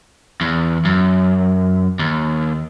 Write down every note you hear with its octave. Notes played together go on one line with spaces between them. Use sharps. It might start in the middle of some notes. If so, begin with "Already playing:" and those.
E2
F#2
D#2